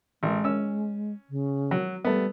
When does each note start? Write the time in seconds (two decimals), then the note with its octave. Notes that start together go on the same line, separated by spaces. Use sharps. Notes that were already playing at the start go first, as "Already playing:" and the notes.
0.23 A1 G#3
0.44 C#4 E6
1.30 C#3
1.71 F#3
2.05 G3 A3 B3